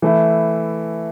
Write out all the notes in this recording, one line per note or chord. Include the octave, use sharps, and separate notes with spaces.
E3 A3 E4